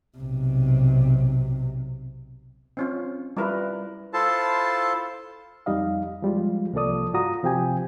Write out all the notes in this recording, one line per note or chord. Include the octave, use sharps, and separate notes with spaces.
B1 C3
C4 C#4 F4
G3 E4 F4 A#4 B4
E4 F4 A4 C5 A5
F2 G3 D#4 D#5 F5
F3 G3 G#3 F4
C2 F3 A#3 A4 D5 D#6
G2 F4 F#4 A#5 D#6
C3 F3 C4 G4 G5 G#5